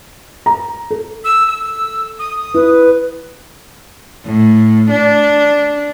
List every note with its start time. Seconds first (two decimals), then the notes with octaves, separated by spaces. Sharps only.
0.46 A#5
0.91 A4
1.24 E6
1.47 E6
2.19 D#6
2.54 E4 B4
4.25 A2
4.90 D4